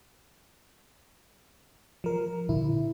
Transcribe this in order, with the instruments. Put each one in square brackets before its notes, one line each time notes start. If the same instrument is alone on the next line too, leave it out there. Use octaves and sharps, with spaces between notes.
[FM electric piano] F3 A#4
[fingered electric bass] A#2 D3 D4 [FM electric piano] E4